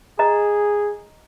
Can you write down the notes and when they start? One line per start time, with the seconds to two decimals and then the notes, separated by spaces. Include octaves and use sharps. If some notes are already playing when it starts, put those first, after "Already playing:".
0.19 G#4 D#5 A#5